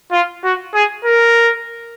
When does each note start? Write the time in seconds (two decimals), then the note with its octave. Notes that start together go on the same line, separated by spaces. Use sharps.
0.12 F4
0.44 F#4
0.74 G#4
1.05 A#4